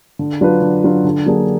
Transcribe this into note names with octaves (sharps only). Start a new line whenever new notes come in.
D3
F#3 D4 F4 B4
D3
F#3 D4 F4 B4
D3
F#3 A#3 D4 G#4